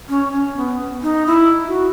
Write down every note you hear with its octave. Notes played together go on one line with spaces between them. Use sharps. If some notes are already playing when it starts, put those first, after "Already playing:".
C#4
C#4
B3
D#4
E4
F#4